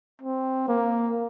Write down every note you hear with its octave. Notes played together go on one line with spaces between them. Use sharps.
C4
A#3